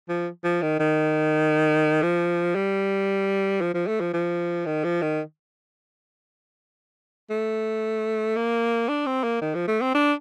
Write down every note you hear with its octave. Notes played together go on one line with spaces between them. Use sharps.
F3
F3
D#3
D#3
F3
G3
F3
F3
A3
F3
F3
D#3
F3
D#3
A3
A#3
D4
C4
A#3
D#3
F3
A3
C4
D4